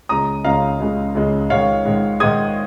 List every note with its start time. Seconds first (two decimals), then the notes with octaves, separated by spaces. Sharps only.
0.09 C#2 C#3 G#3 A#5 D#6
0.45 C#2 C#3 G#3 F5 A#5
0.80 C#2 C#3 G#3
1.15 C#2 C#3 G#3
1.50 G#2 D#3 G#3 C#5 F5
1.85 G#2 D#3 G#3
2.20 G#2 D#3 G#3 D#6 G#6